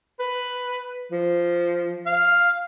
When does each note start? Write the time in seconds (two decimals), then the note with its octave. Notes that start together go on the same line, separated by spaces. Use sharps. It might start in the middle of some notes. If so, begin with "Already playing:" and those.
0.20 B4
1.12 F3
2.06 F5